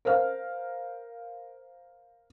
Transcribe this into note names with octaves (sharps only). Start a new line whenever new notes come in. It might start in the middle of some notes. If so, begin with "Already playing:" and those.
A#4 C5 F5 F6